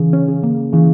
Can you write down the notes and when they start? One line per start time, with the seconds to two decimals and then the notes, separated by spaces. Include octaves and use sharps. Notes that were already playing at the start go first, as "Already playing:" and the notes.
Already playing: C#3 E3
0.13 C#4
0.28 C#3
0.43 A#3
0.73 C#3 E3